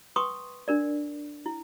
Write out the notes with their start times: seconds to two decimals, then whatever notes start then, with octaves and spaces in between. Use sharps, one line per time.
0.16 B4 G5 C6 C#6 D#6
0.68 D4 A#4 D5
1.46 E4